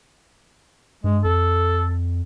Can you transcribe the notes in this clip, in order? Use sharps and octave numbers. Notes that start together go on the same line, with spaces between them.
G2 G#3
F2 A4